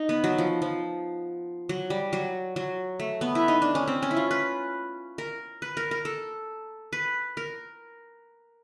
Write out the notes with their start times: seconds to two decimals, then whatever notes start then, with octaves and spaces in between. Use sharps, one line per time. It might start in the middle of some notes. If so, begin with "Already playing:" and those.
Already playing: D#4
0.09 B3
0.24 F#3
0.38 F3
0.62 F3
1.69 F#3
1.90 G3
2.13 F#3
2.56 F#3
3.00 A3
3.21 B3
3.35 E4
3.48 D#4
3.62 D4
3.75 C#4
3.88 C4
4.02 C#4
4.11 E4
4.17 F4
4.31 B4
5.18 A#4
5.62 B4
5.77 A#4
5.91 A#4
6.05 A4
6.93 B4
7.37 A#4